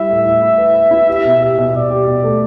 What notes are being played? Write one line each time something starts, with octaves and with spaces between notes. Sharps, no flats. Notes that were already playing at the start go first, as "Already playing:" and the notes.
Already playing: G3 E4 E5
A2
A2
E4
B4
B4
E4
G4 E5
B2
G4 E5
B2
B2 D5
G4
B2
A3